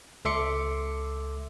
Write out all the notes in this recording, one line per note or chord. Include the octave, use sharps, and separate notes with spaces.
C#2 A4 E5 C6 D6 C#7